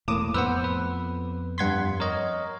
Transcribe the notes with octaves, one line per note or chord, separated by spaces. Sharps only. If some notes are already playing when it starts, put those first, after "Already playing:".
E1 A2 A#3 D6 D#6 E7
F2 B3 B4 C5 F#5 E6
B4
G2 F#5 C6 G#6 B6
A#4 C#5 D#5